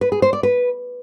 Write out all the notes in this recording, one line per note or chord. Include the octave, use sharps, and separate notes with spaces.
B4
G#4
C5
D5
B4